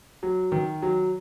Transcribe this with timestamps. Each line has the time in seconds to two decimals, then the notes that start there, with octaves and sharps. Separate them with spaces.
0.23 F#3
0.52 D#3
0.82 F#3